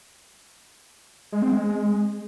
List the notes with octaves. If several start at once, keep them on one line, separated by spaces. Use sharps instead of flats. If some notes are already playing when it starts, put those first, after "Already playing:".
G#3
C4
G#3